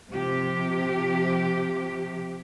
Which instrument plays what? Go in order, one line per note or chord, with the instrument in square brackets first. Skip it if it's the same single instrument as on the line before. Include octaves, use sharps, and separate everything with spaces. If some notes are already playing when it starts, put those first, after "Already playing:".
[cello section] C3 F3 G4